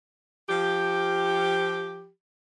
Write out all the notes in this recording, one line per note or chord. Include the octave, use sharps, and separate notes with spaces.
F3 G4